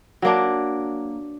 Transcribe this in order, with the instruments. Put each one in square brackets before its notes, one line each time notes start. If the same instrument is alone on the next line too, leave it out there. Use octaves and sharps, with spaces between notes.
[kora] F#3 A#3 D4